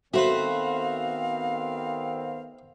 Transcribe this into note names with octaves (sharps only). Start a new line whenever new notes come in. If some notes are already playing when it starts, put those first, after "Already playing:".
D#3 A3 B3 C4 F#4 B4 C5 F5